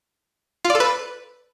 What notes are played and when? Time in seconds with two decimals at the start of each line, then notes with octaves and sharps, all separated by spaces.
0.64 F4
0.70 D5
0.75 A4
0.80 B4